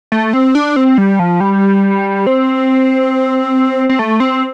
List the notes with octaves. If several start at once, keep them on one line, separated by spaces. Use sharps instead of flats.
A3
C4
D4
C4
G3
F3
G3
C4
C4
A3
C4